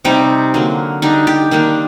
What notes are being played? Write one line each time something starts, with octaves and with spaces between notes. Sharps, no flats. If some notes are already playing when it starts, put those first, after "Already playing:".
C3 G3 C4 D#4
D3 F#3 A#3
D3 G3 D4 D#4
G4
D#3 G3 A#3 D4